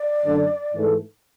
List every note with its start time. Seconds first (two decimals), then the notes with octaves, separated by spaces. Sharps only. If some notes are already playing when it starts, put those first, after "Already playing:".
Already playing: D5
0.25 F#2 D3 A3 D4
0.75 G#2 E3 A3